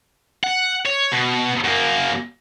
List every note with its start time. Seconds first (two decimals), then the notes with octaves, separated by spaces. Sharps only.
0.43 F#5
0.86 C#5
1.12 B2
1.64 F#2 A#3